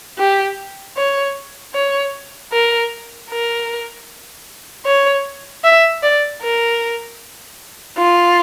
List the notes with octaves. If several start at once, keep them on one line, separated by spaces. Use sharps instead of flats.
G4
C#5
C#5
A#4
A#4
C#5
E5
D5
A#4
F4